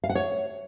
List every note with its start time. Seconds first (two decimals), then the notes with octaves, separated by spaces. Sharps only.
0.04 F5
0.10 F#5
0.15 C#5